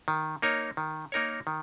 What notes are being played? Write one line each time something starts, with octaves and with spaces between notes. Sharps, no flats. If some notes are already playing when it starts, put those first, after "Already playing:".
D#3
A#3 D#4 A#4 C#5
D#3
A#3 D#4 A#4 C#5
D#3